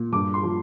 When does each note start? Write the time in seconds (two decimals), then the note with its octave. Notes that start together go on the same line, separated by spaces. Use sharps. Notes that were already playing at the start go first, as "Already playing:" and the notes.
Already playing: A#2
0.12 G2 D6
0.34 C6
0.43 F3